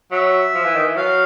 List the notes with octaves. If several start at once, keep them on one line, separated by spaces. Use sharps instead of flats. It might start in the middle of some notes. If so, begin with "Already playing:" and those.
F#3 E5
F3
E3
D#3
E3
F#3 F5